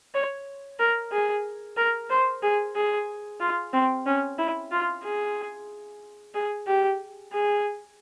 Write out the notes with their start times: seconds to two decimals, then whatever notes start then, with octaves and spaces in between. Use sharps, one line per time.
0.14 C#5
0.79 A#4
1.12 G#4
1.77 A#4
2.10 C5
2.43 G#4
2.75 G#4
3.40 F4
3.73 C4
4.06 C#4
4.38 E4
4.71 F4
5.04 G#4
6.34 G#4
6.67 G4
7.33 G#4